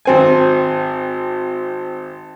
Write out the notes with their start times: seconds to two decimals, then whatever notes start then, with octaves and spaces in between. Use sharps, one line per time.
0.05 G#1 C4 G#5